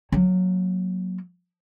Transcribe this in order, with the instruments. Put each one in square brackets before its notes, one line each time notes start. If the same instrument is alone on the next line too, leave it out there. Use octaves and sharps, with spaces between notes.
[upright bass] F#3 A#3